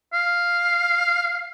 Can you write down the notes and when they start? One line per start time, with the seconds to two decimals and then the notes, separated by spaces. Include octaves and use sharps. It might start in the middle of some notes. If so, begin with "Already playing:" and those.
0.14 F5